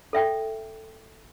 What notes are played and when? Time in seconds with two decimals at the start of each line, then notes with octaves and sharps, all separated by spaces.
0.13 A4 E5 G5